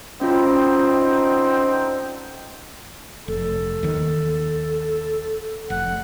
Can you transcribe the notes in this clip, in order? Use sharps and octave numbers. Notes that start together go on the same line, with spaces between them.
D3 C4 C#4 D#4 F4
F1 A4
D#2 D#3
F1 F#5